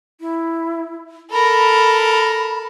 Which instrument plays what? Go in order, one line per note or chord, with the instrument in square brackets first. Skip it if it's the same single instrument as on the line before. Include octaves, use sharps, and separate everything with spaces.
[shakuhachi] E4
[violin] A4 A#4 [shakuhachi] B5